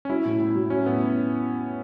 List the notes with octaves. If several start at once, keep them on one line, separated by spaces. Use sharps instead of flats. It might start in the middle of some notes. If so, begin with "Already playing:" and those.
C#4
F#3 E4
A2
A2
F#3
F#3 C#4
A2 B3